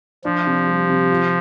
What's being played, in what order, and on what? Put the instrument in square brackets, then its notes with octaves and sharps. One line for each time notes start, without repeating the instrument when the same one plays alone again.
[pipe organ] F3 [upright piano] D4
[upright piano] C3
G3
C3
F4